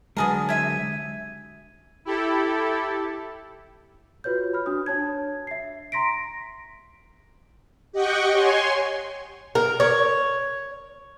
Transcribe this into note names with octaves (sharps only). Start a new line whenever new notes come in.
D3 F#3 G#3 B3 G#4 A#4 A5 D#6
C3 E5 G#6 D#7
E4 G4 A4
F4 F#4 B4 C#5 G6
B5 F6
D4 F#4 D#6
D4 C#5 A5 G#6
E5 C7
A#5 C6 A#6 B6 D7
G4 D#5 F#5 G5 C#6
C#5 G#5 C6
A#4
C#5